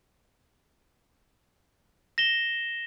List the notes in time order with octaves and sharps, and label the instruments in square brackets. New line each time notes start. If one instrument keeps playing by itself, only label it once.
[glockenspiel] A#6 E7 G7